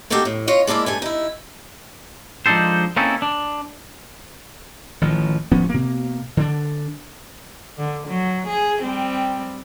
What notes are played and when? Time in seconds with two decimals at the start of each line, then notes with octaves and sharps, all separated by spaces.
0.10 A3 A#3 D#4 F#4 G4 A4
0.25 A2
0.47 F4 C#5 D#5
0.67 G#3 A#3 D4 E4 D5
0.86 G2 A3 G#5
1.02 D#4 E4
2.46 F3 G#3 D4 D#4 A4 C5
2.96 A#3 C4 C#4 D#4 E4 A4
3.22 D4
5.01 A1 D#3 F3
5.51 D1 F3 B3 C#4
5.69 B2 A#3
6.37 D3 D4
7.78 D3
8.08 F#3
8.47 G#4
8.83 G3 C4